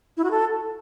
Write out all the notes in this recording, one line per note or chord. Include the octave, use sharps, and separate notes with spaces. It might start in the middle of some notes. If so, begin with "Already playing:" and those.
E4
F#4
A4